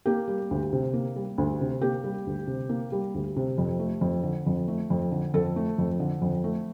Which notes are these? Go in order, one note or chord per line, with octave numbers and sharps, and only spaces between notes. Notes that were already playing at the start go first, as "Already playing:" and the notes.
A#3 G4
G3
D2
C3
A#3
G3
D2
C3
A#3 G4
G3
D2
C3
A#3
G3
D2
C3
F2
A3
F2
D3
F2
A3
F2
D3
F2 A4
A3
F2
D3
F2
A3